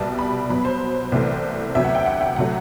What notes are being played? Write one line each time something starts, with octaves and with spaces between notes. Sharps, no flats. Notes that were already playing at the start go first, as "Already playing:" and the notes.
Already playing: C2 B2 G3 B3 A5
B5
B2 F#3 B3 B5
C5
C2 C3 E3 A3
D2 C3 F#3 B3 E5
F#5
G5
F#5
F#5
C3 F#3 A3 F#5